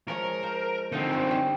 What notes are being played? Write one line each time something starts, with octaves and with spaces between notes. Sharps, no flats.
F3 G#3 A#4 C#5
C5 F5
D3 F3 G3 C4 D#4
F#2 G3
G3